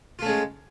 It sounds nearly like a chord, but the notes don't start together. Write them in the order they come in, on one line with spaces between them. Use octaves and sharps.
F4 A3 C#4 G#3